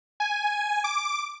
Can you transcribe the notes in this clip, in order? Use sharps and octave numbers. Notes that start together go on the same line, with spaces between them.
G#5
D6